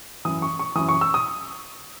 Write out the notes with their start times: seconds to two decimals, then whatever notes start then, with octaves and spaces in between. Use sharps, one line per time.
0.25 F#2 E3 D#6
0.42 C#6
0.59 C#6
0.75 F#2 E3 D#6
0.89 C#6
1.01 E6
1.14 D#6